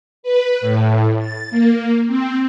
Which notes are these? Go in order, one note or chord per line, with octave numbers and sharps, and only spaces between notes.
B4
A2
A6
A#3
C4